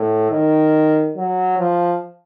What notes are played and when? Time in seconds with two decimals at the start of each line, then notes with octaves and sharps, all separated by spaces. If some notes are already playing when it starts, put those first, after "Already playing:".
Already playing: A2
0.31 D#3
1.17 F#3
1.59 F3